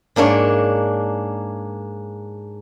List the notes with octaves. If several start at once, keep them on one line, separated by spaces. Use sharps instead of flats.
G#2 A#3 D4 C#5